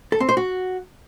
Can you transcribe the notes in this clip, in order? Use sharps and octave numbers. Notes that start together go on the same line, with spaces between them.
A4
C4
C5
F#4